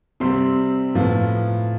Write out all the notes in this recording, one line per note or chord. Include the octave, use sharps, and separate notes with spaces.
C3 G3 C4 C6
A2 F3 B3